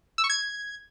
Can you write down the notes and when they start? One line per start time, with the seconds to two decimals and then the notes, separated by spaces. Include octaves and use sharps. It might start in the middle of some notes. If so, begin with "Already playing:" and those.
0.18 E6
0.24 C#6
0.30 G#6